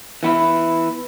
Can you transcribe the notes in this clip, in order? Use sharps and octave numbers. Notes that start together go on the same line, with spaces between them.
E3 B3 E4